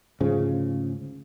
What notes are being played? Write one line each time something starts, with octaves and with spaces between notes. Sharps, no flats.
D2 G#2 C#3 F3